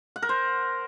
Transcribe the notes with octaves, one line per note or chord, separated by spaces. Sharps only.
F#5
A#4
C5